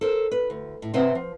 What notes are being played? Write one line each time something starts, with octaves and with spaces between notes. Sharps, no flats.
A4 A#4 C5
B4
D2
A2
C3 C4 B4 C5 E5 F#5
F3